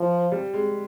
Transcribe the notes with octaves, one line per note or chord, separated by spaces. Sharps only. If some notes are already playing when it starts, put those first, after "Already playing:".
Already playing: F3
G3
G#3